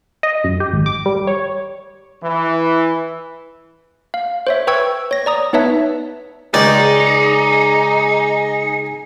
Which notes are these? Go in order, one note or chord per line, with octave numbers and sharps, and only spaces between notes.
D#5
F#2
G4
G#1
D6
G3
C#5
E3
F5
C5 C#5 E5
B4 G5 C#6 E6 G#6
C#5 A#6
D5 A#5 D#6
B3 D#4 B4 C#5 E5 A5
C#2 G#3 D#4 G#4 D5 G5